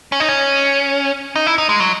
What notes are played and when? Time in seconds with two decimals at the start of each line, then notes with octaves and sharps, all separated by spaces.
0.12 C#4
0.20 D#4
0.29 C#4
1.36 D#4
1.47 E4
1.58 D#4
1.69 G#3
1.80 F#3